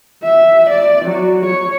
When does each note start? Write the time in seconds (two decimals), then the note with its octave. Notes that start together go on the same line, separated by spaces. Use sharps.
0.23 E5
0.70 D5
1.06 F#3
1.46 C#5